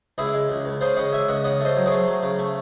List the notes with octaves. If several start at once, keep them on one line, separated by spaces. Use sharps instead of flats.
C#2 E4 G#4
G#3
C#2
C#2
C#3 G#4 C5
C#3 D#5 F#5
C#2 E5 G#5
C#2 D#5 F#5
C#3 D#5 F#5
A3 C5 D#5
F#3
G#4 C5
A3
F#3
C#3
A3